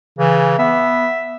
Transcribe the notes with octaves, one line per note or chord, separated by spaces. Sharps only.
C#3 E3
B3 E5